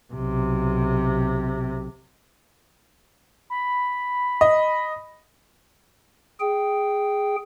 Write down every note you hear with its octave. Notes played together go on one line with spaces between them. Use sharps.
B1 C3
B5
D#5
G#4 G5